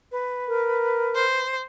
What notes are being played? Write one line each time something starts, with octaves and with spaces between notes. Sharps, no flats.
B4
A#4
C5